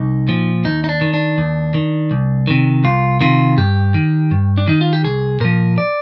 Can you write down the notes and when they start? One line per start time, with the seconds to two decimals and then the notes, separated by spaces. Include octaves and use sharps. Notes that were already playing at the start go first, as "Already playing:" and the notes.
Already playing: C2 D#4
0.28 A#2 F3
0.65 D#2 D#4
0.84 D#4
0.89 D4
1.01 D#3
1.14 D4
1.38 D#2
1.74 D#3
2.11 C2
2.47 C3 D#3
2.84 C2 F4
3.21 C3 D#3 F4
3.58 G2 G4
3.94 D#3
4.31 G2
4.58 D4
4.68 D#3 D#4
4.81 F4
4.93 G4
5.04 C2 G#4
5.40 A#2 F3 A#4
5.78 D5